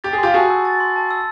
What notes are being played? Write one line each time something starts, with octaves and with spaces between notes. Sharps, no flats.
G4 A6
G#4
F4 G4 C6
F#4 G#4 A5
E6
A6
C6
A5
E6